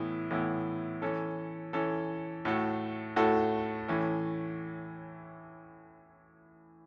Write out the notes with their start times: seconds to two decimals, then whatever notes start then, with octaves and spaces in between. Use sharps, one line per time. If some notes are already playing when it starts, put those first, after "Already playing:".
Already playing: A2 E3 B3 E4
0.31 A2 E3 B3 E4
1.02 E3 C#4 A4
1.73 E3 C#4 A4
2.45 A2 A3 F#4 A4
3.16 A2 A3 F#4 A4
3.88 A2 E3 A3 C#4